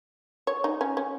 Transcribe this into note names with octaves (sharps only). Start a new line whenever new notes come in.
C#5
D#4
C#4
C#4